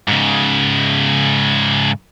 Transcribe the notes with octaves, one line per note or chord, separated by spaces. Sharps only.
G#2 C#3